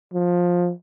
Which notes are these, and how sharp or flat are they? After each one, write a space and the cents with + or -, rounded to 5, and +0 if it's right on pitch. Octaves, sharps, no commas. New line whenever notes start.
F3 +15